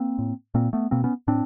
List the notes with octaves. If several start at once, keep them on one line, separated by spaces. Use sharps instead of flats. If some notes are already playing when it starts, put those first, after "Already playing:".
Already playing: A#3 C4
A2
A#2 A#3 C4
A3 B3
B2 A#3 C4
B3 C#4
A2 C4 D4